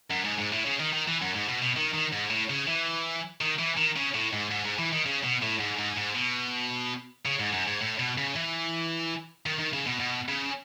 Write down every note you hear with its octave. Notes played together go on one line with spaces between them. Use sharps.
F#2
G#2
G#2
A2
C#3
D#3
D#3
E3
F#2
G#2
B2
B2
D#3
D#3
G#2
A2
C#3
E3
D#3
E3
D#3
C#3
A2
G#2
G#2
G#2
E3
D#3
C#3
B2
A2
G#2
G#2
G#2
B2
C#3
G#2
F#2
G#2
A2
B2
C#3
E3
D#3
D#3
C#3
B2
B2
C#3